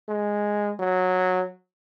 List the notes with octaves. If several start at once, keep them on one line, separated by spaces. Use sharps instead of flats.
G#3
F#3